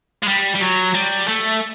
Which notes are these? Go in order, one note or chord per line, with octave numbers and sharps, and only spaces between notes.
G#3
G3
G3
F#3
G3
A3